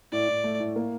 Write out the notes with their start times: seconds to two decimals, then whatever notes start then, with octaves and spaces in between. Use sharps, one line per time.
0.12 A2 D5
0.28 A2
0.44 A3
0.60 A2
0.76 A#3